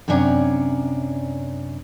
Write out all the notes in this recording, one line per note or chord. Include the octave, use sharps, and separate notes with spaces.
F#2 C3 C#4 D4 C#5 A#5